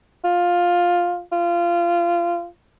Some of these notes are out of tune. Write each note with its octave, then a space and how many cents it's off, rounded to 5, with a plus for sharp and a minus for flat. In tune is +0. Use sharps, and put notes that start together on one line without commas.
F4 +10
F4 -20